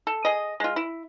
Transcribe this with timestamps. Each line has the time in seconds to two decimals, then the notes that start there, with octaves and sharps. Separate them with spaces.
0.07 A4
0.25 G#4 D#5
0.60 G#3 F4
0.76 E4